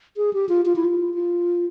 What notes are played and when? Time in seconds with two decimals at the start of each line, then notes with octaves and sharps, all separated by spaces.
0.17 G#4
0.33 G4
0.49 F4
0.65 F4
0.76 E4
0.85 F4
1.14 F4